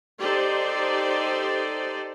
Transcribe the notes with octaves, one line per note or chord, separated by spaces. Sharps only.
D#4 G4 A4 C5 D5